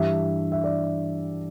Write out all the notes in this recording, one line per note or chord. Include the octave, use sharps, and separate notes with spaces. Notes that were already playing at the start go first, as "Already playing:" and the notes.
Already playing: G2 E3 G3 D4 E5
E5
D5